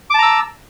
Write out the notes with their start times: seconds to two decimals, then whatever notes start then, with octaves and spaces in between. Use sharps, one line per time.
0.10 D6
0.14 A5
0.18 A#5
0.23 E6